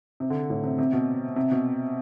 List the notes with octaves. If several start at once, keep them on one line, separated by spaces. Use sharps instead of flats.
C3
D3
A2
C3
C3
B2
C3
B2